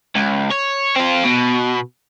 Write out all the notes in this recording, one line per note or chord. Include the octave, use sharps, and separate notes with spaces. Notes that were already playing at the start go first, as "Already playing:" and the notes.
C#2
C#5
C4 F4
B2